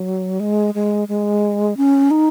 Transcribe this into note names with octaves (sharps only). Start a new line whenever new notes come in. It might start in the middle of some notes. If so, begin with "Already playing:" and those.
Already playing: F#3
G#3
G#3
G#3
C#4
D#4